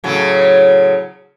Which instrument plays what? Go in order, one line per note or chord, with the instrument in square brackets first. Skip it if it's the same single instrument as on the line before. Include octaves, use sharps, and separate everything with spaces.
[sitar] A2 C#3 F#3